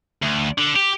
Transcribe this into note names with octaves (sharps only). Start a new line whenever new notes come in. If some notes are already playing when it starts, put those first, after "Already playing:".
D2
D3
G4